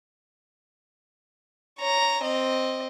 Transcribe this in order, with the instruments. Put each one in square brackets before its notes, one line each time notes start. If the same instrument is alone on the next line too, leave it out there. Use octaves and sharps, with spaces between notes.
[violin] C#5 A#5
C4 D#5